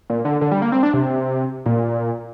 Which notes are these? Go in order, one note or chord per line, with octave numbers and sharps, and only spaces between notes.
A#2
D3
D3
G3
A#3
C4
D4
C3
A#2